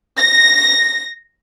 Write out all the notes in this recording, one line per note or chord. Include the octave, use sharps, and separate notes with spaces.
A#6